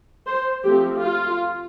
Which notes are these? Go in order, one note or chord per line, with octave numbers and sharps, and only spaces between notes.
C5
F3 A3 C4 G4
F4